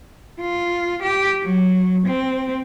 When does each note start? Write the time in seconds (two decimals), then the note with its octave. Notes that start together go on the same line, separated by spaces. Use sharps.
0.41 F4
1.03 G4
1.44 F#3
2.07 C4